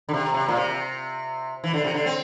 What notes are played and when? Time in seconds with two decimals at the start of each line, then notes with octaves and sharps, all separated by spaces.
0.09 D3
0.14 C3
0.34 C3
0.48 A#2
0.57 C3
1.64 E3
1.74 D3
1.84 C3
1.94 D3
2.06 C4